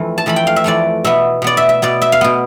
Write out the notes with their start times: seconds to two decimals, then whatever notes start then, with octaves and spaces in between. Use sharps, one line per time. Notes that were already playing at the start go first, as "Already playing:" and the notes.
Already playing: F2 E3 A3
0.18 A5
0.26 F2 E3 A3 B5
0.36 G5
0.47 F5
0.56 E5
0.64 F2 E3 A3 D5
1.04 B2 B3 E5
1.42 B2 B3 D5
1.57 E5
1.69 E5
1.82 B2 B3 D5
2.02 E5
2.12 F5
2.21 B2 B3